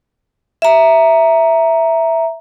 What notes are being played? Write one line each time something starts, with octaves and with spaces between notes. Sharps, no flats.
E5 A#5